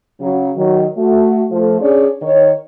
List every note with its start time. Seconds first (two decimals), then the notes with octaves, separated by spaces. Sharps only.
0.21 C#3 F#3
0.57 D#3 F#3
0.98 A3 F#4
1.51 F3 A3
1.81 C#4 D4 G#4 C#5 D5
2.22 D#3 C#5